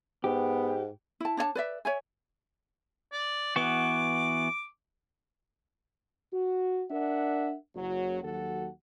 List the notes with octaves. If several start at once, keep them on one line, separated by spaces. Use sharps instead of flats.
G#2 B3 G4
E4 A5
D4 C#5 D#5 A5
B4 D5 E5
C#5 E5 G#5
D5
E3 B3 F#4 D6
F#4
D4 A#4 E5 F#5
F#1 F#3
D#2 F#3 F#4 A4 F#5